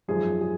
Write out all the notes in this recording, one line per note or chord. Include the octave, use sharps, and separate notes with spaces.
G#1 F#2 F3 G#4
G#4